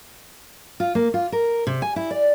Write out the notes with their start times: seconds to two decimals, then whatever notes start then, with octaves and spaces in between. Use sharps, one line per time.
0.80 F4
0.95 A#3
1.14 F4
1.32 A#4
1.67 C3
1.82 G#5
1.96 E4
2.11 D5